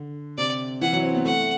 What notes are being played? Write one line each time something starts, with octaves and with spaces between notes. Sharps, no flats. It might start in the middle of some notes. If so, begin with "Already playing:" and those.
Already playing: D3
C3 D5
E3 F#5
F#3
C4
B3
A3 F#5